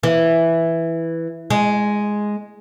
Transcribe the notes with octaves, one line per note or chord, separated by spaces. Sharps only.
E3
G#3